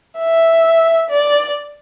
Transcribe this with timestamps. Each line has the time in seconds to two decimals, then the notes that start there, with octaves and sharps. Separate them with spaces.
0.19 E5
1.10 D5